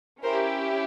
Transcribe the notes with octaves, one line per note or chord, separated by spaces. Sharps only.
C#4 E4 G4 A#4 C5